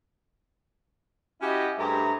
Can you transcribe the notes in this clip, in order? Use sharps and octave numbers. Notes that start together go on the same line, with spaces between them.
C#4 E4 F#4 G4 D#5
G2 A3 G4 G#4 C5 A#5